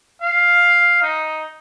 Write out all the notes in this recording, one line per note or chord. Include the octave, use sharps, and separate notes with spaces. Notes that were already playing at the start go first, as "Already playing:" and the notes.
F5
D#4